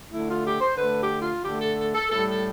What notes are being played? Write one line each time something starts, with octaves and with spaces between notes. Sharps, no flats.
D3 A3 E4
F4
G4
C5
D3 A3 B4
G4
F4
D3 A3 G4
A4
A4
A4
A2 G3 A4
A4